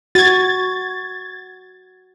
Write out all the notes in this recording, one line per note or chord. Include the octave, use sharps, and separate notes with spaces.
F#4 G#6 A6